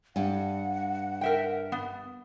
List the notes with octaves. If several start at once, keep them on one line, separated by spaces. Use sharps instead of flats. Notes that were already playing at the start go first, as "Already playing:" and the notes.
G2 F#5
A#4 E5 G5
B3